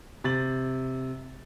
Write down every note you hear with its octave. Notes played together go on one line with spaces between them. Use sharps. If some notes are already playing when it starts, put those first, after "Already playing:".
C3 A6 F#7